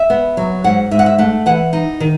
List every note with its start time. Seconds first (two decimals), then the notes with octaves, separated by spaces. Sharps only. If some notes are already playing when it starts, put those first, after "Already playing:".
Already playing: E5
0.10 B3
0.37 F#3
0.64 G#2 F#5
0.91 G#2 E5
0.99 F#5
1.06 E5
1.18 A3 F#5
1.46 E3 F#5
1.73 D#4
2.00 D#3